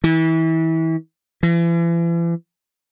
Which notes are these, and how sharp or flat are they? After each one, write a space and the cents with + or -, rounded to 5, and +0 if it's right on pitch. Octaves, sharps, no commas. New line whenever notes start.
E3 -30
E3 +40